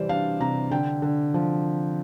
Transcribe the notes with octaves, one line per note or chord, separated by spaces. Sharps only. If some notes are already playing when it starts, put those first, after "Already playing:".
Already playing: C3 E3 G3 C5 D5
D4 F5
C3 A#5
D3 G5
D3
F3